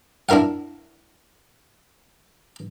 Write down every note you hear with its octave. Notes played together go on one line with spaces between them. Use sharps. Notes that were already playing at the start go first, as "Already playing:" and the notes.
D4 E4 A#4 F5 F#5